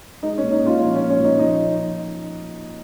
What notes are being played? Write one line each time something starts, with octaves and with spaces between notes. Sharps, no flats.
G#3 D#4
C#4
A#2
D#4
A#2 C#4 F4
F3 C#4
C#4
A#2
C#4
A#2
D#4
F3 D#4